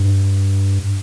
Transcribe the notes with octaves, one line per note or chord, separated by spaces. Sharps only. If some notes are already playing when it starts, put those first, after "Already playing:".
Already playing: G2